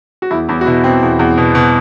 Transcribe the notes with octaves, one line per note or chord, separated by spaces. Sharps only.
F#4
E2 E4
E2 E4
F#4
B2 E4
B2 C4
E2
E2
B2
B2